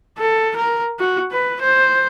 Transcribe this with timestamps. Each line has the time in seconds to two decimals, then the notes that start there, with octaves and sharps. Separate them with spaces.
0.19 A4
0.56 A#4
0.99 F#4
1.32 B4
1.62 C5